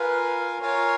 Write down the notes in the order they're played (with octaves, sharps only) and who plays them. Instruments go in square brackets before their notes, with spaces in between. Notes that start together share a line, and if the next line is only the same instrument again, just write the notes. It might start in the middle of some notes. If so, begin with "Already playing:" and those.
Already playing: [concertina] F4 A#4 F5 G#5 [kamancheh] B4
[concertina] F4 A#4 F5 G#5 [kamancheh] C#5